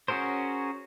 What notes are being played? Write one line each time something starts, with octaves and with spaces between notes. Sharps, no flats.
C#4 F#4 G#4 A#4 C5